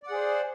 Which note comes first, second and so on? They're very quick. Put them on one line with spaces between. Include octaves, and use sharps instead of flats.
D5 F#5 G#4 C5